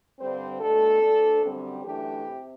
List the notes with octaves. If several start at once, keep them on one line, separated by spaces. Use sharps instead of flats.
G2 D3 G3 C4 C5
B2 A3 D4 A4
D2 D3 A3 D4
F#2 D3 G3 C4
F#2 E3 A3 D4 G4
C3